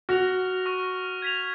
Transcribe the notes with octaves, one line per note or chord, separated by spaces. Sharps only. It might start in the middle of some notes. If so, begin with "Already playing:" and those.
F#4 F6 A#6 F7
C#6 F6 A#6
G#6 B6 F7